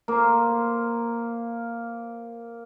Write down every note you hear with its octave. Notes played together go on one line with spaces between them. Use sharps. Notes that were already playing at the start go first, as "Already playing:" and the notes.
A#3 C5